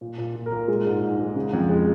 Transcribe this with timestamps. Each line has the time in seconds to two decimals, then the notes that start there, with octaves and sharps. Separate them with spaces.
0.01 A#2
0.18 A#2
0.35 A#2
0.46 A#4
0.52 A#2
0.68 G#3
0.85 G#2
1.02 G#2
1.19 G#3
1.35 C#3
1.53 F2
1.69 G#3